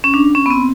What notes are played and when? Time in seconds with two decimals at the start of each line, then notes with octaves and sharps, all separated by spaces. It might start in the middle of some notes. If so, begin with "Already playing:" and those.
0.04 C#4
0.14 D4
0.35 C#4
0.46 B3
0.50 C4